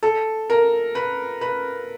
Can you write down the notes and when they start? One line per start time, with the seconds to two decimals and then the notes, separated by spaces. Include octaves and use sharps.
0.03 A4
0.50 A#4
0.95 B4
1.41 B4